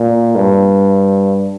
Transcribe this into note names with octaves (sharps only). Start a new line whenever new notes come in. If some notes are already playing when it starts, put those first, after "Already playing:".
Already playing: A#2
G2